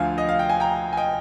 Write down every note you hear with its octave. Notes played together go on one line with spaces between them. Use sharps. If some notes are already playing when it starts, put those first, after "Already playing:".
Already playing: D2 D3 F3 F5 G#5
D#5
F5
G5
G#5
G5 A#5
G#5
D#5 G5